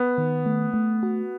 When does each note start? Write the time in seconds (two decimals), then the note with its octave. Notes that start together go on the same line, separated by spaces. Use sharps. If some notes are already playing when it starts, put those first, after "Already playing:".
Already playing: B3
0.18 D#3
0.46 A3
0.74 A3
1.03 F#4